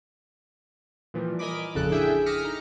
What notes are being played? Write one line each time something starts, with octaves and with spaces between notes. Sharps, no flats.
A#2 E3 F3 G3
A#4 D#5 G#5 B5 D6
A1 F2 A#2 C#3 A4 F#6
D4 E4 G#4 E5 G5 G#5
D6 D#6 F6 A#6 B6 C#7
D#4 A#5